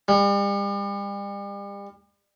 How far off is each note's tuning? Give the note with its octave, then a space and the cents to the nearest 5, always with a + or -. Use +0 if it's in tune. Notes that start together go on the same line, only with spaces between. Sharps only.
G3 +40